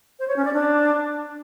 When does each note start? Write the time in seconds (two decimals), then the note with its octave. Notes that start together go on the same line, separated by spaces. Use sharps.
0.19 C5
0.28 C#5
0.36 C#4
0.45 D5
0.53 D4